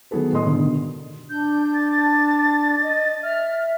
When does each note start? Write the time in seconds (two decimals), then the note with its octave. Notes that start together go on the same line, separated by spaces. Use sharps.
0.11 D#3 F#3 B3 G#4 A4 B4
0.33 A2 A4 D#5 C6 D#6
0.46 G2 B2 D3 D#3
1.30 D4 G6
1.74 A6
1.91 A6
2.82 D#5
3.23 E5 F6